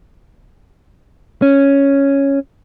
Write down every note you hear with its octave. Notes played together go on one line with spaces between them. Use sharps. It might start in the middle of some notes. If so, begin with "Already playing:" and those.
C#4